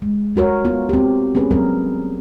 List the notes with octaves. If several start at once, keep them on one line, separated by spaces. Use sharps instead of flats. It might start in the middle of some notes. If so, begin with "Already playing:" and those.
G#3
G3 F#4 A#4 C#5
B3 F4
C4 G4
B3 C#4 G#4 B4
F#3 G3 C4 A#4